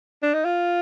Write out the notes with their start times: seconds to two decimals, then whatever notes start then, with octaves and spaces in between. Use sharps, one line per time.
0.23 D4
0.34 D#4
0.45 F4